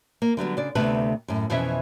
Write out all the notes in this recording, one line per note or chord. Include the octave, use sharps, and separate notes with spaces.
A#3
D3 F#3 G3 B3
C#3 D4 D5
D2 C3 A3 B3 A4 B4
F#2 A2
F2 B2 E3 C#4 E5